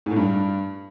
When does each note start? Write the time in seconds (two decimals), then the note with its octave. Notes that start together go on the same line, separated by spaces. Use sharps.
0.06 G#2
0.11 A2
0.16 G2